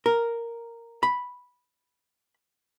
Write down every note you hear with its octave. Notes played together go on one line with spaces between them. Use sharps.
A#4
B5